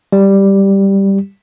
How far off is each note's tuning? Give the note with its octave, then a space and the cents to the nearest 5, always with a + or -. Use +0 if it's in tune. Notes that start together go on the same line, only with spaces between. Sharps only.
G3 +0 G4 +0